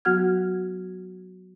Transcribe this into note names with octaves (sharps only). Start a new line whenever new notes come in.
F#3 B3 F#4 F#5 F6 G#6